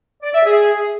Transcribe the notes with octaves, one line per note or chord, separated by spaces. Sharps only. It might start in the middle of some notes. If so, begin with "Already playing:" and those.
D5
E5
G#4